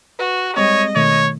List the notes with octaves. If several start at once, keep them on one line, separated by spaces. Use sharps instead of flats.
F#4 B4
G3 G#3 C4 C#5 D#5
B2 D#3 A3 C#5